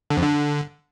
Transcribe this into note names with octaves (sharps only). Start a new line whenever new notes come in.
D3
F2
D3